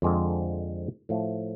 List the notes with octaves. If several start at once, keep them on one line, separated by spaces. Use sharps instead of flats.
F2 D3 G#3 C4 F4
A2 F3 A3